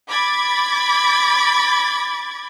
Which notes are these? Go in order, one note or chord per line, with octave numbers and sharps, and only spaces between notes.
B5 D6 G#6 A6